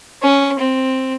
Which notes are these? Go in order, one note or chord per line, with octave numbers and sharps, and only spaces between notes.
C#4
C4